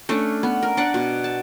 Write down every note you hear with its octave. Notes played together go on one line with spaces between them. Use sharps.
A3 C#4 D4
B3
A#4
D4 D5 F#5
B2
A5